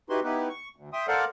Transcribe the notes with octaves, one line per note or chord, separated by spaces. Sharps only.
D#4 E4 F#4 G4 B4 C6
B3 D#4 E4 G4 B4
C#6
D2
E5 G5 C6 D#6
A4 A#4 C5 D5 F5 F#5